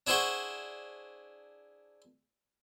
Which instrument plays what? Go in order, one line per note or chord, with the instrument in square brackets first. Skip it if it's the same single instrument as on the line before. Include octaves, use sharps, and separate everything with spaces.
[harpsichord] D4 E4 G#4 C5 F#5 C#6